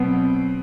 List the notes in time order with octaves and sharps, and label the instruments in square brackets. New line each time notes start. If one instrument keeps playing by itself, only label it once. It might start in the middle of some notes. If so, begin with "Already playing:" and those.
Already playing: [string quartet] B2 F#3 C4 [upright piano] B3